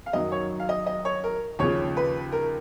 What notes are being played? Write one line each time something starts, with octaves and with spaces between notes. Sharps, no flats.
F5
F#2 D#3 F#3 D#5
C#5
F5
D#5
D#5
C#5
A#4
D#2 C#3 F3 C#5
B4
A#4